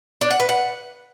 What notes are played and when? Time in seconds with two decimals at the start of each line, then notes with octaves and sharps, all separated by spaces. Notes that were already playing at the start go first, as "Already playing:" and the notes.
0.21 D4
0.30 F#5
0.40 B4
0.49 F#5